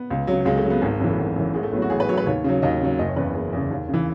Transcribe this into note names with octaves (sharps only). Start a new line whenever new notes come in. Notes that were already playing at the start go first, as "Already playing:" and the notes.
Already playing: B3
C#2
C#3 F#3
C#2 G#3
A3
C#3 F#3
B3
G#1 G#3
F#2 E3 B3
A3
G#1
F#2 E3
A1 G#3
A3
A2 F#3 B3
F#4
A1 G#4
B4
A2 F#3 C#5
B4
D#2 C#5
C#3 F#3
D#2 D#5
C#3 F#3
F#1 D#5
C#5
E2 C#3 B4
F#1 G#4
E2 C#3
D#2
C#3
E3